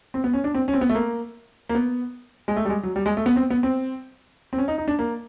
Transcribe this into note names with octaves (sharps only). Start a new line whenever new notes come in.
C4
B3
C#4
D4
C4
C#4
C4
B3
A3
A#3
A#3
B3
G#3
A3
G3
G#3
F#3
G3
G#3
A3
B3
C4
B3
C4
C4
C#4
D#4
D#4
D4
A#3